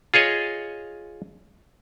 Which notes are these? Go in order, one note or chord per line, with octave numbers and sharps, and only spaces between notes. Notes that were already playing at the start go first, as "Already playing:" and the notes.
F4 G#4 C#5 D#5